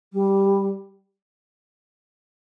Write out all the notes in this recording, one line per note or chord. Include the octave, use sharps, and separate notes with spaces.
G3